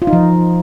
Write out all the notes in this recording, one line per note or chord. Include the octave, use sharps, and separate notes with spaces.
F4
D#4
F3